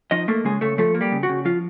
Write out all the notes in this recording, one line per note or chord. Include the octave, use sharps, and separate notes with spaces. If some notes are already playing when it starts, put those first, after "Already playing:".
F3 D#4 D#5
A3 A#3 A4
C#3 G#3 G#4
C#3 A3 A4
F3 A3 A4
A#3
G3 G4
C#3
F#4
C#3
F3 F4